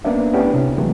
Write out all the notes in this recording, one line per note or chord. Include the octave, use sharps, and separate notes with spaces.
A#3 B3 C#4 D4 E5
A3 B3 C#4 D4 E4 G4
C2 C3
E3 F#3 G#3 A3 B3